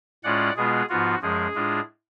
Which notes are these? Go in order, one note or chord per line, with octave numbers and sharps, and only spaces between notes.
A2 G#3 C#4 F4 D5 F#5
B2 G#3 B3 F4 G#4
G#2 F3 B3 F4 F#4
F#2 F3 G#3 G#4
A2 G#3 D4 F4